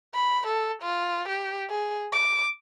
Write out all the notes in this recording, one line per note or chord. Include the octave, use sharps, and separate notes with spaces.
B5
A4
F4
G4
G#4
D6